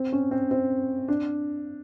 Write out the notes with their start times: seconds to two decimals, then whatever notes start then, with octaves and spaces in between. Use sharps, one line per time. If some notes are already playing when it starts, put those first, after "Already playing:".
Already playing: C4
0.12 C#4
0.31 C4
0.51 C4
1.08 D4